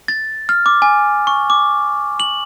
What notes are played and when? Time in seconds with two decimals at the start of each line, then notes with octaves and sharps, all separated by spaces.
0.08 A6
0.49 F6
0.66 D6
0.82 G#5
1.27 C#6
1.50 D6
2.20 F#7